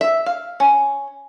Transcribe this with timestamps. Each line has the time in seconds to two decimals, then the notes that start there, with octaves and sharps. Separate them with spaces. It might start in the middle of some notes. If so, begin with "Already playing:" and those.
0.01 E5
0.26 F5
0.60 C#4